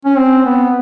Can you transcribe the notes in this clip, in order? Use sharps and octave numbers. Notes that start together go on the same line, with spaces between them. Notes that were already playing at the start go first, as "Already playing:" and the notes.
C#4
C4
B3